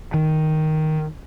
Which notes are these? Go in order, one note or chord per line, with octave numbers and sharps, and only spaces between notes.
D#3